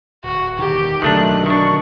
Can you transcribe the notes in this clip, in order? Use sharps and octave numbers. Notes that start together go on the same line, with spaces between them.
D1 F#4
E1 D#3 G4
B1 D3 D#3 F#3 A3 D4 F#6
D#3 D4 C#6